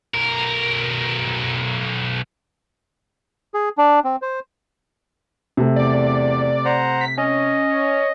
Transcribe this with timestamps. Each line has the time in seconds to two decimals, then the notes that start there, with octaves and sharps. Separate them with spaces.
0.14 B1 A#4
3.54 G#4
3.78 D4
4.04 C4
4.22 C5
5.57 C3 A3
5.76 E2 D5
6.65 C5 F#5 A#5
7.01 B6
7.18 C#4 D#5